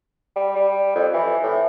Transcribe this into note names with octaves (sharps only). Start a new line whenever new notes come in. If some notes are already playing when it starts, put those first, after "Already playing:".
G3
G3
F2
E3
A2